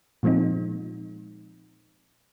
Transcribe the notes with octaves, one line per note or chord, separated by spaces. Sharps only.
A#2 F3 G#3 C4 D#4